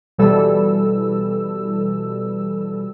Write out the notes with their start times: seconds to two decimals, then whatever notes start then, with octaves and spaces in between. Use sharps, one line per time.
0.18 B2 E3 G3 A4 E6